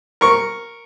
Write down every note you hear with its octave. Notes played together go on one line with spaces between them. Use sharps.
A#4 C#6